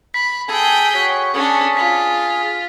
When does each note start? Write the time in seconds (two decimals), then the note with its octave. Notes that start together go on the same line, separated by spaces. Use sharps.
0.14 B5 B6
0.48 G#4 A4 G5 G#5
0.94 F#4 C#5 B6
1.34 C#4 D4 G#4
1.77 F4 B6